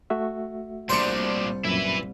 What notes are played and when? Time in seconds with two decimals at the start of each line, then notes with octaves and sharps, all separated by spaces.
0.10 A3 F#4 E5
0.89 C2 A#2 D4 C5 D5 C#6
1.65 F#2 A#2 E4 B4